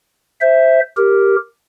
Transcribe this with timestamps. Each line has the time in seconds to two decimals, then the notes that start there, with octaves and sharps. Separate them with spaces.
0.41 C5 E5
0.97 G4 A#4